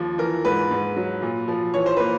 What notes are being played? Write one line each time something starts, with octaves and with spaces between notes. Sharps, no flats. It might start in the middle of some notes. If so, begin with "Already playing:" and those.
Already playing: D#2 F3
E3 A#4
G#2 B4
G#2
F#3
A#2
F3
E3 C#5
C5
A#3 B4